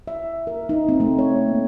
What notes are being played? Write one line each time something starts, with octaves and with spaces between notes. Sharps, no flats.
E5
A#4
D#4
C4
A3
C#5
A#3